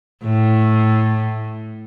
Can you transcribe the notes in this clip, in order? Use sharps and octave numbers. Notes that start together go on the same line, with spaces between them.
A2